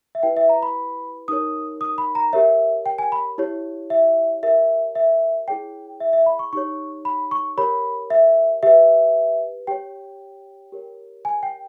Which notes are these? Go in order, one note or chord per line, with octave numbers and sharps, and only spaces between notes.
E5
E4 G4 B4 G5
E5
A#5
B5
D#4 G4 A#4 C#5 D#6
D#6
B5
A#5
G4 A#4 C#5 E5
G5
G#5
B5
E4 G4 C#5
E5
G4 A#4 C#5 E5
E5
E4 G#4 C#5 G5
E5
E5
B5
C#6
D#4 G4 C#5 C#6
B5
C#6
G4 A#4 C#5 B5
E5
G4 B4 E5
G4 C#5 G5
G4 A#4 C#5
G#5
G5